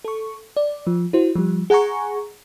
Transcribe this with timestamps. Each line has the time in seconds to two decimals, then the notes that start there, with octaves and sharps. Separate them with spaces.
0.05 A4 C#6
0.57 D5
0.87 F3
1.13 E4 F#4 C5
1.35 F3 G3
1.70 G#4 F#5 G#5 A#5 C#6